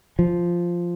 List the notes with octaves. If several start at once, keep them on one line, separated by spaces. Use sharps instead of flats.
F3